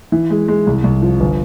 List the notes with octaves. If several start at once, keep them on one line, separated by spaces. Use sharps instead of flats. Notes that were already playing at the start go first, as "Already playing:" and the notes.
E3
G#3
G#3
C2
C2
F3
G1